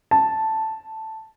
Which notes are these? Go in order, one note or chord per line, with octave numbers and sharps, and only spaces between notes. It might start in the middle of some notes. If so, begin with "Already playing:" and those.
A5